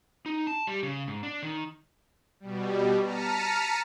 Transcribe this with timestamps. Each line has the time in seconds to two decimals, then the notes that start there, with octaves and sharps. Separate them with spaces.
0.26 D#4
0.47 A5
0.67 G3
0.83 C#3
1.07 G#2
1.23 D4
1.43 D#3
2.40 B2 G3
3.02 A5 A#5 F6 B6 C#7 D#7